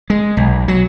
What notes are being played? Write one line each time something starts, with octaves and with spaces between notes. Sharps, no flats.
G#3
B1
F#3